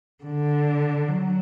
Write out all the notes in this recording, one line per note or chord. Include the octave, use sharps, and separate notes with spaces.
D3
F#3